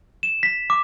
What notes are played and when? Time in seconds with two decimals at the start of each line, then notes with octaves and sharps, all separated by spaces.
0.23 E7
0.43 B6
0.70 D6